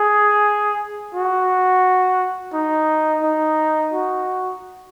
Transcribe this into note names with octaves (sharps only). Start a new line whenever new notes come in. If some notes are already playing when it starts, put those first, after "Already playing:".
Already playing: G#4
F#4
D#4
D#4
F#4